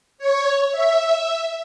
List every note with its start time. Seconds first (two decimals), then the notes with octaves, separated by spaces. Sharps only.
0.18 C#5
0.71 E5